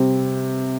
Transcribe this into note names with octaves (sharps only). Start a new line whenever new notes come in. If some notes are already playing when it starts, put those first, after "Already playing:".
Already playing: C3 G3 C4